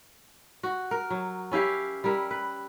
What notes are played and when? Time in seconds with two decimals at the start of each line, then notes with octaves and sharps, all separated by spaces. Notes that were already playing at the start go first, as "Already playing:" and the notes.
0.63 F#4
0.91 A#4
1.10 F#3
1.52 C#4 E4 G4 F5
2.04 G3 E4 A#4
2.31 B4